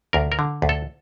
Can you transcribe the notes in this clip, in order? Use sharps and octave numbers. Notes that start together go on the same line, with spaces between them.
D2 A#4
A#4
D3
D2
A4